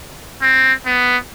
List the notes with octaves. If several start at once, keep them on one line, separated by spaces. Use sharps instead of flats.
C4
B3